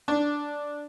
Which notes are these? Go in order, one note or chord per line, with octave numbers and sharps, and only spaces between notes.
D4